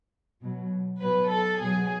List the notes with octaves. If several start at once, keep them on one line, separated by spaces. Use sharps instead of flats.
B2 F#3
B2 F#3 B4
A4
B2 F#3 G#4